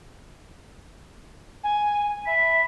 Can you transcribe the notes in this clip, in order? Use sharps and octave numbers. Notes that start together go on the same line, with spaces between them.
G#5
E5 B5